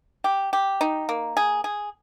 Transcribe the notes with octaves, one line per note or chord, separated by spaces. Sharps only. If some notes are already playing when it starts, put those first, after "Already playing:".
G4
G4
D#4
A#3
G#4
G#4